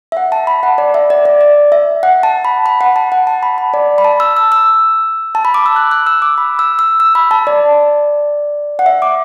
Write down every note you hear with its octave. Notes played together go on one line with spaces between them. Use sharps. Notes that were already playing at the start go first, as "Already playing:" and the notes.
E5
F#5
A5
B5
F#5
D5
E5
D5
D5
D5
E5
F#5
A5
B5
B5
F#5
A5
F#5
A5
B5
B5
D5
B5
A5
E6
E6
E6
A5
B5
D6
E6
F#6
F#6
E6
D6
B5
E6
E6
E6
B5
A5
D5
F#5
E5
D6